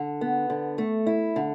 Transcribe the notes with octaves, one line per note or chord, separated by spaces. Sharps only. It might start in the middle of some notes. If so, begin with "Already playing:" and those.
Already playing: D3
B3
D3
A3
E4
D3